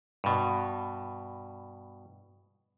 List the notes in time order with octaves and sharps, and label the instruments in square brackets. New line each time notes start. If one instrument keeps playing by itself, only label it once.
[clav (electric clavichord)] G2 B2